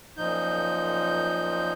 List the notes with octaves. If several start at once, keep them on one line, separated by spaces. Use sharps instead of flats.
F#2 A#2 F3 D#4 G6